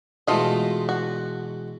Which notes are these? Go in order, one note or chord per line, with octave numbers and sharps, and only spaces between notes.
B2 E3 G#3 A3 F4 D#5
F#4